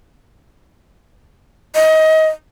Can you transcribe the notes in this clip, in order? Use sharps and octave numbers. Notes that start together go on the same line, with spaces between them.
D#5